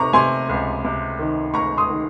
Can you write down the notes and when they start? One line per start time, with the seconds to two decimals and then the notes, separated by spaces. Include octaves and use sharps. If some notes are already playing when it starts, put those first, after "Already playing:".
Already playing: C3 D#3 A#5 C#6
0.13 C3 G#5 C6
0.49 C#2
0.84 C3
1.19 D#3
1.54 C#2 A#5 C#6
1.77 C6 D#6
1.89 D#3